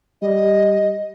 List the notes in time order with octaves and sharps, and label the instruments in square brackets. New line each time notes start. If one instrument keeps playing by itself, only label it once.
[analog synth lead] G3 [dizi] D#5